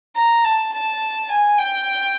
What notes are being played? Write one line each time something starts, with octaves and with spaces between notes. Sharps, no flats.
A#5
A5
A5
G#5
G5